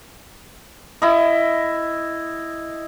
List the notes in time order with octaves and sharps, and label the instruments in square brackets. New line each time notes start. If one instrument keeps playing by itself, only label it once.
[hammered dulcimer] E4 D#5